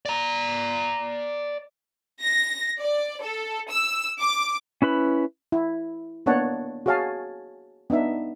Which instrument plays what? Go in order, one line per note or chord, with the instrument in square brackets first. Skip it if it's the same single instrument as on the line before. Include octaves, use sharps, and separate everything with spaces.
[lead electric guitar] D5 A#5
[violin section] A#6
D5
A4
E6
D6
[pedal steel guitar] C#4 E4 B4 B5
[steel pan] E4
A#3 B3 D4 C#5 F#5 A5
F#4 G#4 C#5 F5 G#5 A5
B3 D4 D#4 E5